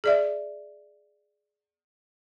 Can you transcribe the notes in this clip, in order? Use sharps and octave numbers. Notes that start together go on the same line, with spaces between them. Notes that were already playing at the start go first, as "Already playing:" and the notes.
G#4 D5 E5